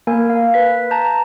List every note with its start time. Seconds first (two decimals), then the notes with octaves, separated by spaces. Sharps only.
0.07 A#3 A#4 G#5
0.30 F5
0.54 B4 B6
0.91 A5 A#5 G6